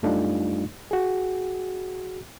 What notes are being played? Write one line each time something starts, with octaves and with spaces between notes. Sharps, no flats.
F#2 G3 A3 D4 D#4 F4
F#4 G#4